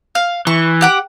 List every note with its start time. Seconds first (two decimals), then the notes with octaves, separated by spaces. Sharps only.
0.15 F5
0.47 E3 C#6
0.81 G4 F#5 D6